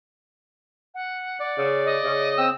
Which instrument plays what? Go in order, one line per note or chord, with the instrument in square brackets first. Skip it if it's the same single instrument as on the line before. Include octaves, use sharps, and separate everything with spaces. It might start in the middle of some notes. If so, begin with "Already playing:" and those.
[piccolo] F#5
[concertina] D5
[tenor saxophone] C#3
[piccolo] D#5
[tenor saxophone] C#3
[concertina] C4 E6